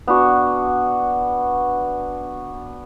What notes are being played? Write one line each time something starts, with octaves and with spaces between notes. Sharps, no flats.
B3 D4 F#4